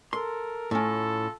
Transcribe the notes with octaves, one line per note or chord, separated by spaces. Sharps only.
A4 A#4 C6
A2 C#4 F4 A4